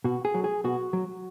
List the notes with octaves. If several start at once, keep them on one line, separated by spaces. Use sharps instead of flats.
B2 F#4
G#4
F#3
G#4
B2 F#4
F#3